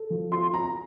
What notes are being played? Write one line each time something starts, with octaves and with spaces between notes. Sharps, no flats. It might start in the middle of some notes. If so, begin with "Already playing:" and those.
Already playing: A4
F3
F4 C6
F4 A#5